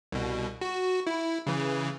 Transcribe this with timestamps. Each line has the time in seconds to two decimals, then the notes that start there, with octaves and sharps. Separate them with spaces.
0.12 C2 B2
0.61 F#4
1.07 E4
1.47 C#3 E3